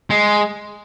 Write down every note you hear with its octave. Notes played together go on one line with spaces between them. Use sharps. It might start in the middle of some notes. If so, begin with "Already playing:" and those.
G#3